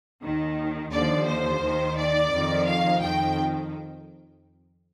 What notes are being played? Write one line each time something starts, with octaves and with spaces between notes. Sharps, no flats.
D#2 D#3
D#2 D3 F3 D5
C5
D#2 D#3
D5
F2 D#3
F5
F2 D#3 G5